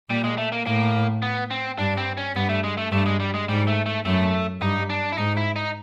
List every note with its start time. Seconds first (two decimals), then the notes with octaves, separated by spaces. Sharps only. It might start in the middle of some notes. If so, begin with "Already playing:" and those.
0.09 A#2 G3
0.24 G#3
0.38 A3
0.52 A#3
0.66 A2 A#3
1.22 B3
1.51 C4
1.79 G2 D4
1.97 C4
2.17 C#4
2.35 G2 B3
2.49 A3
2.64 G#3
2.77 A3
2.92 G2 A3
3.06 G#3
3.20 G3
3.34 G#3
3.49 G#2 G3
3.68 A3
3.86 A3
4.05 F#2 A3
4.61 G2 D#4
4.90 D4
5.12 E4
5.18 G#2 D#4
5.37 E4
5.56 D#4